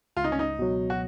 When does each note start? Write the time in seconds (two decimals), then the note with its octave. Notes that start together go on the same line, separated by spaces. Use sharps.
0.17 C#2 F4
0.24 D#4
0.32 C#4
0.39 D#4
0.59 B2 F#3
0.90 F#4